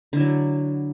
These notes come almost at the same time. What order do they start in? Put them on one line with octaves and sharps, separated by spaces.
D3 E4 F#3